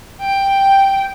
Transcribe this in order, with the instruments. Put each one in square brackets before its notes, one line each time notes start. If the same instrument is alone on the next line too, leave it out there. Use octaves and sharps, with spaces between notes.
[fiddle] G5